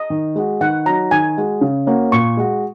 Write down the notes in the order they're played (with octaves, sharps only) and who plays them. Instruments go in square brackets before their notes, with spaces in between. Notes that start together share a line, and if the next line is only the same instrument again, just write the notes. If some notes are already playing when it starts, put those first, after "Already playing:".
Already playing: [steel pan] D#5
[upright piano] D#3
G#3 F#4
[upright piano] D#3 [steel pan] F#5
[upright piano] F#3 D#4 [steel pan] A#5
[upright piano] D#3 [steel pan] G#5
[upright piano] G#3 F#4
C#3
A#3 C#4 F#4
[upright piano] A#2 [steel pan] C#6
[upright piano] G#3 F#4